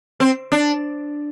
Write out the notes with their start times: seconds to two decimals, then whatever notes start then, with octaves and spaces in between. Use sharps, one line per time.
0.20 C4
0.52 D4